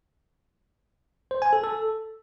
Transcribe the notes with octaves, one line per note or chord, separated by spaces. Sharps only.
C5
G#5
A4
A4